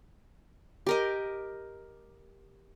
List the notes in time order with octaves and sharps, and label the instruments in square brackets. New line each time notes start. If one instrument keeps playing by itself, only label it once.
[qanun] G4 A#4 D#5